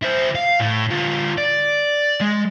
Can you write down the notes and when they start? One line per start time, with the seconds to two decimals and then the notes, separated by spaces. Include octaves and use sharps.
0.03 E4 C5
0.35 F5
0.60 A2
0.91 D3 F4
1.38 D5
2.21 G#3